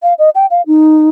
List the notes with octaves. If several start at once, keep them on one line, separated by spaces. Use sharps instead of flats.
F5
D#5
G5
F5
D#4